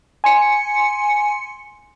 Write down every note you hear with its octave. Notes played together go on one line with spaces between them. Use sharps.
G#5 C6 C#7